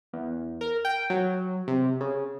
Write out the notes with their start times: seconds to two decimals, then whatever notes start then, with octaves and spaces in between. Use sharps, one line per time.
0.13 E2
0.61 A#4
0.85 G5
1.10 F#3
1.68 C3
2.01 C#3